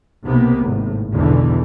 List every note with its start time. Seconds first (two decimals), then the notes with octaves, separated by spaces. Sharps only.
0.24 B1 C3 A#3 B3
0.61 G#1 A2
1.12 B1 E2 B2 D3 E3